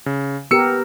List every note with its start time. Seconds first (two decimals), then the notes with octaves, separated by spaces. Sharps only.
0.06 C#3
0.51 B3 G4 A#4 E6 C#7